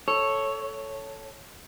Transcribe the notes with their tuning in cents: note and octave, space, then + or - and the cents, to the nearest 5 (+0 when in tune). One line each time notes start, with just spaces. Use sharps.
A4 +0 C#5 +0